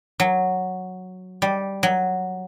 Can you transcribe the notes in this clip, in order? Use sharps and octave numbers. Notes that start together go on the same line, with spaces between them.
F#3
G3
F#3